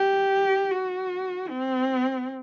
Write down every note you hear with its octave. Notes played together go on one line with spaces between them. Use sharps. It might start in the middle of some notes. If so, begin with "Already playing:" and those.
Already playing: G4
F#4
C4